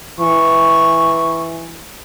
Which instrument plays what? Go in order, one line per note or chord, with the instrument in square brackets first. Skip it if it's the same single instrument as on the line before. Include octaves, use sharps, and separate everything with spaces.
[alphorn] E3 [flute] C#6